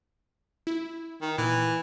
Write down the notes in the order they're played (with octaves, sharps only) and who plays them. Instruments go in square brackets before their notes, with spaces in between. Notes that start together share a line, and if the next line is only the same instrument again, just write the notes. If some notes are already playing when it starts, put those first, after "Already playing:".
[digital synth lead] E4
[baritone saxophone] D#3
[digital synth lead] A#2 [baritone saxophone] E3